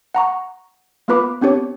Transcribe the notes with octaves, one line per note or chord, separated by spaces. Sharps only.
F#5 A#5 C#6
A#3 B3 F4 B4 B5 D6
B3 C4 D4 G4 C#5